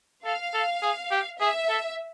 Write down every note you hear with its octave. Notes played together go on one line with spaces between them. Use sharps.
A4 F5
A4
G#4
G4
G#4 E5
A4